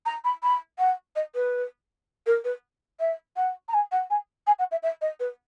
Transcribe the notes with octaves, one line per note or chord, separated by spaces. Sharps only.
A#5
B5
B5
F#5
D#5
B4
A#4
B4
E5
F#5
A#5
G#5
F#5
G#5
G#5
F#5
E5
E5
D#5
B4